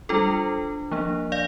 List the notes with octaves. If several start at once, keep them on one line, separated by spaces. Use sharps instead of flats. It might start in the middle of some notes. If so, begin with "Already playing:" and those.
G3 D4 F4 A4
F3 A#3 D4
D5 F5